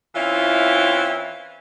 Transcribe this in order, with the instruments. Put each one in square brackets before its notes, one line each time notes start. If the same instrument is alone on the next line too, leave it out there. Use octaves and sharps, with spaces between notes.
[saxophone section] E3 C4 C#4 E4 F4